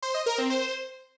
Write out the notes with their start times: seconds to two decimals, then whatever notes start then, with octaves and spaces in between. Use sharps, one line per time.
0.02 C5
0.14 D#5
0.26 A#4
0.38 C4
0.50 C5